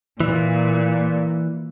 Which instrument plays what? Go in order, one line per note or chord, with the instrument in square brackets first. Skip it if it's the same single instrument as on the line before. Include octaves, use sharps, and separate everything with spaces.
[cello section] A#2 [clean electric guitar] E3